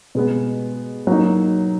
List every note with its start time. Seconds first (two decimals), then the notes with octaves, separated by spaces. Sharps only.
0.15 B2 G#3 B3
1.07 F#3 A#3 D#4